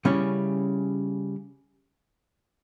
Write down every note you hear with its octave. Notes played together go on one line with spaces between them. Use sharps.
C#3 G3 C#4 E4